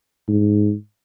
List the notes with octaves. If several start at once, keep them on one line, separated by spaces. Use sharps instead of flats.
G#2